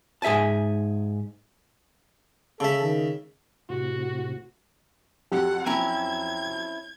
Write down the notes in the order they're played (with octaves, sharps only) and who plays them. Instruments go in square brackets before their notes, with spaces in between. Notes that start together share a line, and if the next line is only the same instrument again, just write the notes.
[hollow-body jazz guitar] G#2 G#4 E5 G#5 A5
[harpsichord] C#3 E5 [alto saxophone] A4
[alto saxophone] D#3
[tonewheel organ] A2 C3 [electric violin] F#4
[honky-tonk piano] F2 F#3 [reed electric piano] G4 [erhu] F#5
[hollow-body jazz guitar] C4 C#4 E4 [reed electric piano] G5 A#5 [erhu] G#6